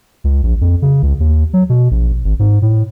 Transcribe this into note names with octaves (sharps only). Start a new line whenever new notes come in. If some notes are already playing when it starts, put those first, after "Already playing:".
C#2
A#1
F2
C#3
C#2
D#2
F#3
B2
A#1
G#1
G#2
A2